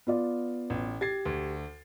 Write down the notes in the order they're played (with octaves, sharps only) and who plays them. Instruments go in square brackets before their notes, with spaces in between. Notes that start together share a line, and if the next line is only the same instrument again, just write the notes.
[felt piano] B3 F4 D5
[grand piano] A1
[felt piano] G4 [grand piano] G#6 A6 C7
[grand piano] D2